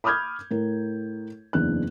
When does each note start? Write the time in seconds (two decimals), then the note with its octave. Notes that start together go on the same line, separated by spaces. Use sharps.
0.04 B5 D6 D#6 F6 G6 G#6
0.51 A2 A#4
1.53 F#1 E2 D4 F#6